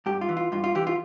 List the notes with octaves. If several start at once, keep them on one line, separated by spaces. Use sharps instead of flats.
G2 G4
F4
E3
F4
G2 F4
F4
E3 G4
F4